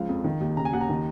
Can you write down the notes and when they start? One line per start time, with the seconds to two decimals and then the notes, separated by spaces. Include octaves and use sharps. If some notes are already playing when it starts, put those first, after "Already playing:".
Already playing: C#2 F3 F5
0.09 F2
0.24 D#3
0.41 D#2
0.57 C#3 A#5
0.65 G#5
0.73 D#2 F#5
0.81 A#5
0.89 D#3